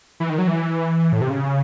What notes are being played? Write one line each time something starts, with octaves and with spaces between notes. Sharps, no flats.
E3
D#3
F#3
E3
A2
C3
C#3